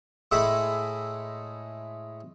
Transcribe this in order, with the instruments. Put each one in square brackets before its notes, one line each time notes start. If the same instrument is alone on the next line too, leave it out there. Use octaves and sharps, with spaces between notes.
[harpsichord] A2 G#3 A3 E5 B5